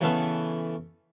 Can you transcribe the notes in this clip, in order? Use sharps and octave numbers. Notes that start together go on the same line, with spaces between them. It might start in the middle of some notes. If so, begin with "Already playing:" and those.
C#3 E3 A3 B3 G#4 A4